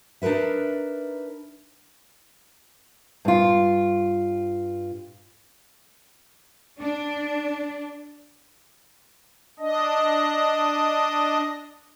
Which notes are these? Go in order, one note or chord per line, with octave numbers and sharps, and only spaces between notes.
D4 D#4 A#4 B4 E5
G2 F4
D4
D4 D#5